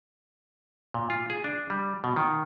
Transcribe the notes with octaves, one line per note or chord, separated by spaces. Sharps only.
A#2
F4
G#4
D4
G3
B2
D#3